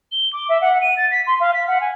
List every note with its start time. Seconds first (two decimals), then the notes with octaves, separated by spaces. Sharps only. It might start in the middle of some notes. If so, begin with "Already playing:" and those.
0.12 G7
0.33 D6
0.49 E5
0.61 F#5
0.81 D#7
0.97 A6
1.11 B6
1.27 C6
1.40 F5
1.54 B6
1.68 F#5
1.81 G#5